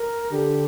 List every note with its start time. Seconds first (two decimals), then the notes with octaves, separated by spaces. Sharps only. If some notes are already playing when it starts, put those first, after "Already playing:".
Already playing: A#4
0.31 D3 G4